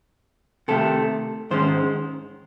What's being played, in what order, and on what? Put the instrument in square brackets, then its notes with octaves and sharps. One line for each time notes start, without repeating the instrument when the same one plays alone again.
[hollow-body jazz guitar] C3 D#3 A3 A4
G#2 D#3 G#3 C#4 C5